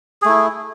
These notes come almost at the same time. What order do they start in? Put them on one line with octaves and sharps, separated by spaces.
G#4 A3 E4